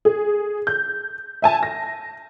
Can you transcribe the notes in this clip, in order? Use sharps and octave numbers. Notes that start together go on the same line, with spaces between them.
G#4
G6
E5 G#5 A5
A#6